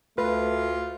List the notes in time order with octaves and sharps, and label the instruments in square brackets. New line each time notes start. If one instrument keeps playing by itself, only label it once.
[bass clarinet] D2 [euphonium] A3 [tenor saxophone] F4 [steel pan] B4